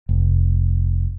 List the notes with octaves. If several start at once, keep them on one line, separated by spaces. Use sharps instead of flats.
F1